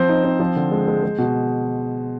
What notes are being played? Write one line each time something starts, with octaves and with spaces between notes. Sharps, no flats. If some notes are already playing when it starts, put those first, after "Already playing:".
Already playing: F3 C4 C5
D#4
C4
F3
D3
G#3
G#3
G#3
B2